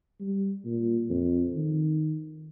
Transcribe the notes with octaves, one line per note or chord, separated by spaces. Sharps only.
G3
A#2
F2
D#3